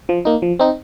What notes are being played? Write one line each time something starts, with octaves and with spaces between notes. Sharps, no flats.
F3
A#3 D#4
F3
C4 D#4